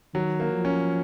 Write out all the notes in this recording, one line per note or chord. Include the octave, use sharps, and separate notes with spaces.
D#3 F#3
A#3
F3
C#4